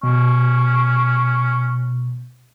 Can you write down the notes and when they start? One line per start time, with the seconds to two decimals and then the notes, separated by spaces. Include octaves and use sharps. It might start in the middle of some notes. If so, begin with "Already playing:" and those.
0.03 B2 C#4